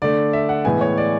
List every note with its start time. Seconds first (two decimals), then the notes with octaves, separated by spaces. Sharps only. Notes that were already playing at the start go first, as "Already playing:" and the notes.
0.02 D3 A3 D5
0.33 E5
0.49 F#5
0.65 A2 E3 G#3 B3 G#5
0.81 C#5
0.97 D5